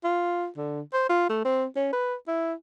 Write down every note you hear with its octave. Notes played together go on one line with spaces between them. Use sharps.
F4
D3
C5
F4
A3
C4
C#4
B4
E4